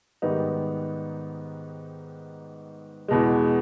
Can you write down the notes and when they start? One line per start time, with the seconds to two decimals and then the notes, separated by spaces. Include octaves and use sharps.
0.22 G#2 D#3 G3 B3 D#4
3.08 E2 B2 G#3